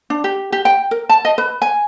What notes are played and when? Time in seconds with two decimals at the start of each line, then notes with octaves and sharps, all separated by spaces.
0.10 D4
0.24 G4
0.52 G4
0.65 G5
0.91 A#4
1.09 A5
1.25 D#5
1.38 B4
1.62 G#5